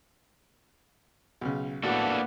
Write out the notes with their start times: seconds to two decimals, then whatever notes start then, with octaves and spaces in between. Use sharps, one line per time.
1.41 B1 C#3
1.83 A2 A#3 B3 D4 F#4 A4